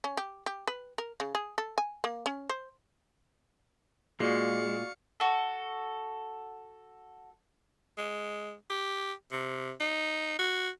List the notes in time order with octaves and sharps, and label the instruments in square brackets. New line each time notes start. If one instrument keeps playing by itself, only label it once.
[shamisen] C#4
G4
G4
B4
A#4
C#3
G#4
A4
G#5
A#3
C#4
C5
[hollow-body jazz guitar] A#2 [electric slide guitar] G#3 [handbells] F#4 D5 C#6 [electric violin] F5 C#7
[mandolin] F#4 A4
[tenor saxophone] G#3
G4
C3
D#4
F#4